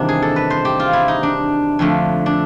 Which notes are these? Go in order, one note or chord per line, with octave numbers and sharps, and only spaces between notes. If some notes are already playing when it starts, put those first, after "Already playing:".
Already playing: E2 C3 D#3 G3 A#3 D4
G#4
A4
B4
C5
G4
F4
E4
D#4
D4
F2 D3 F3 A3
D4